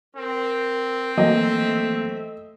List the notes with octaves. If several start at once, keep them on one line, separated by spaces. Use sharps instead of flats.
C4 A#4
E3 F#3 A3 A#3 D#5 E5